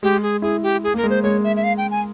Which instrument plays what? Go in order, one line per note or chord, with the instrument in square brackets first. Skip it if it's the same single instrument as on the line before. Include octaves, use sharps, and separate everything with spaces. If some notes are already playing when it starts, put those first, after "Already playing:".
[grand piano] G#3 [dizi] G4
[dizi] G#4
[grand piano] E4 [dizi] G#4
[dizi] G4
G#4
[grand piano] A#3
[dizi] A#4
[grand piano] G#3
[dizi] C5
[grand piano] G#3 [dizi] C#5
[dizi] E5
E5
F5
G5
G#5